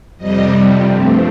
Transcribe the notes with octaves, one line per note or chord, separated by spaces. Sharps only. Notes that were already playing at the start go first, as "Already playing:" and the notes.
F2 C3 G3 D#5
G2 F3 A3 C4